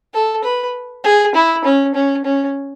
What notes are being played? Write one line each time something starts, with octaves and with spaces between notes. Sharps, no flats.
A4
B4
G#4
E4
C#4
C#4
C#4